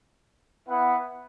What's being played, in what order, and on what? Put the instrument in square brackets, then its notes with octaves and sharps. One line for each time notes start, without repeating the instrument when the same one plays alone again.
[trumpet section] B3 E4 B4 F#5